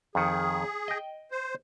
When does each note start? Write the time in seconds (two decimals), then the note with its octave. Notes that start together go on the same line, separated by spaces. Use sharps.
0.15 F2 D#3 G#4
0.88 D#5 G5
1.31 C5